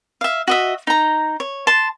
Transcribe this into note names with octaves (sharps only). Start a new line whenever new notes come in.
E5 F5
F#4 D#5 E5
D#4 A#5
C#5
A5 C6